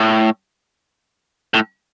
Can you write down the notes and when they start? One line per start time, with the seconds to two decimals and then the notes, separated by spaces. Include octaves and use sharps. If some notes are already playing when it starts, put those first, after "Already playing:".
Already playing: A2
1.54 A2